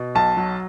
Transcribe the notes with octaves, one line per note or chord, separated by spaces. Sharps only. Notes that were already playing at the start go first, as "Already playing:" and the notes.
Already playing: B2
B1 A5
F#3